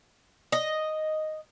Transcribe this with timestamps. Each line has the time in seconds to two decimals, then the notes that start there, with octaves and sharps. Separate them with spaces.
0.52 D#5